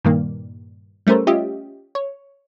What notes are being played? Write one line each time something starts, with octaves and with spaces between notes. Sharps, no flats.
G2 A#2 D#3 A#3
G3 A3 C#4 A#4 C5
C#4 F4 G4 D#5 E5
C#5